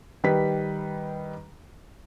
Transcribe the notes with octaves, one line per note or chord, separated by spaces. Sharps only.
D#3 G3 B4 B6